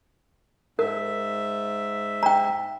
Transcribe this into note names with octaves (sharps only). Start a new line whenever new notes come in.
G#2 A#4 E5
G5 A#5